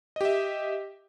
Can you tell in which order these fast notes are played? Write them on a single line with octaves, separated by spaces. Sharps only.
D#5 G4 E5